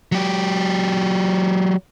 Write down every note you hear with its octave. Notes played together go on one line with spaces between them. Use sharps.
F#3 G4